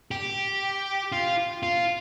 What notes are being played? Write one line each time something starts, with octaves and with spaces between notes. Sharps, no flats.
G4
F4
F4